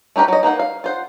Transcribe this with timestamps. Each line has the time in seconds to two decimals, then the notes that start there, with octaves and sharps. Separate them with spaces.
0.16 A3 D#4 G4 A#4 B4
0.28 F#3 D#5
0.43 A#3 D#4 B4 F#5
0.59 F5
0.84 F4 C5 F#5